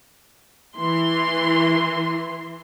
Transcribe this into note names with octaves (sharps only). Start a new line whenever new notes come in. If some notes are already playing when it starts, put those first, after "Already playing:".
E3 C6